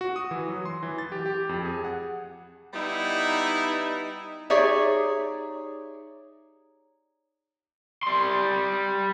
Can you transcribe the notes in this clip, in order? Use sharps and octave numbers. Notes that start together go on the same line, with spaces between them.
F#4
D#6
E3
F#3
C6
E3
A6
G4
G4
F2
G#4
F#5
G3 B3 D#4 E4
D#4 G4 G#4 C#5 D5 E5
G3 C6